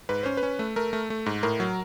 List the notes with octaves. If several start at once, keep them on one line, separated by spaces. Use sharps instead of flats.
G#2 B4
C#4 C5
B4
C#4
A3
A3 A#4
A3
A3
G#2
A2 A#4
F#3